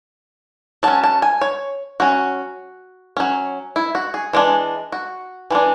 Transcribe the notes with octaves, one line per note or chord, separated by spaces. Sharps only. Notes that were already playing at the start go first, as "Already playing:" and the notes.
F#3 C#4 A5
A5
G#5
C#5
F#3 C#4 F#4
F#3 C#4
E4
F#4
G#4
E3 G#3 D4
F#4
E3 G#3 D4